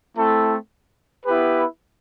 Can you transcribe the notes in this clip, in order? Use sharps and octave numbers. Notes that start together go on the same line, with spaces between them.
A3 C4 E4 A4
B3 E4 G4 B4